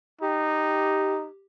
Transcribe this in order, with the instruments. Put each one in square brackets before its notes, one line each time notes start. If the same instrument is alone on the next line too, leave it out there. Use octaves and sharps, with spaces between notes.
[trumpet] D#4 [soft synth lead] G4